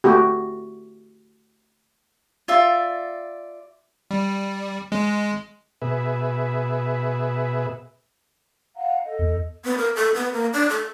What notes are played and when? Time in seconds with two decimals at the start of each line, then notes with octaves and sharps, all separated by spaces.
0.04 A3 F#4 G4
2.48 F4 D5 E5
4.11 G3
4.92 G#3
5.82 B2 G#4 B4 E5
8.76 F5 F#5 A#5
9.05 A4 D#5
9.19 E2
9.64 B3
9.78 A#4
9.96 A4
10.15 B3
10.33 A#3
10.53 D4
10.69 A4